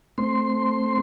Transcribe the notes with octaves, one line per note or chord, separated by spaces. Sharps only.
A3 C4 C6